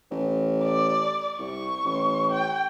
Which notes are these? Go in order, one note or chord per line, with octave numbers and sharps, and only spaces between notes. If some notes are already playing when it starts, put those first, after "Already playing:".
A1
D5
C2 C#6
A1
G5